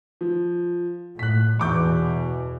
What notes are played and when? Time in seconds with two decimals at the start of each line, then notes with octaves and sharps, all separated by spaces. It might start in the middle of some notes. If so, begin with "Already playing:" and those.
0.21 F3
1.19 A2 F#6 B6
1.60 E2 B2 E3 C#6 D6 G6